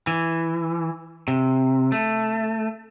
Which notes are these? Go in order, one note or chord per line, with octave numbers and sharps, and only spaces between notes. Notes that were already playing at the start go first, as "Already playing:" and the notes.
E3
C3
A3